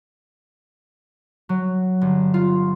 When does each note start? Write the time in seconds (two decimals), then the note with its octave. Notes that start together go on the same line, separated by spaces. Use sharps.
1.49 F#3
2.01 G1
2.34 F4